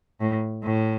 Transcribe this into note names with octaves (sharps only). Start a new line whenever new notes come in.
A2
A2